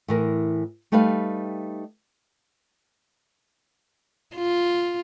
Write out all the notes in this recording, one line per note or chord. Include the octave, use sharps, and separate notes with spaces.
A2 E3 A#4
G3 A3 D#4 G4 B4 F5
F4